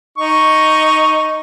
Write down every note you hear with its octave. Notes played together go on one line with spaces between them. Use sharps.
D#4 C#6